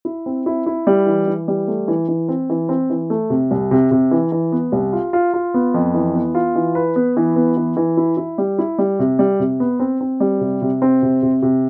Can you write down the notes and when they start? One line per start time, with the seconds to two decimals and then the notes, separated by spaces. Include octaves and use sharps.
0.05 E4
0.26 C4
0.46 E4
0.66 E4
0.87 G3
1.07 E3
1.27 E3
1.48 G3
1.68 A3
1.88 E3
2.08 E3
2.28 C4
2.50 E3
2.69 C4
2.90 E3
3.10 A3
3.30 C3
3.51 C2
3.71 C3
3.91 C3
4.11 E3
4.32 E3
4.52 B3
4.72 C2
4.93 F4
5.13 F4
5.34 F4
5.54 B3
5.74 F2
5.94 E3
6.15 B3
6.35 F4
6.55 E3
6.75 B4
6.96 B3
7.17 E3
7.36 B3
7.57 E3
7.77 E3
7.97 E4
8.17 E4
8.38 G3
8.59 E4
8.78 G3
8.99 C3
9.19 G3
9.40 C3
9.60 B3
9.80 C4
10.01 C4
10.20 G3
10.41 C3
10.62 C3
10.82 C4
11.02 C3
11.23 C3
11.42 C3